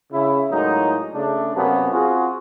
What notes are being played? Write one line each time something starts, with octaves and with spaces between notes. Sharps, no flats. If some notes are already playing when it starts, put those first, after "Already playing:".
C#3 E4
A2 F#3 G#3 A#3 D#4
C#3 A3 D4
F#2 C3 F#3 A#3 B3 C#4
C4 F4 F#4 G#4